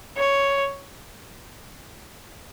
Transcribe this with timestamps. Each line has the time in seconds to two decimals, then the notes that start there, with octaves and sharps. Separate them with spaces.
0.17 C#5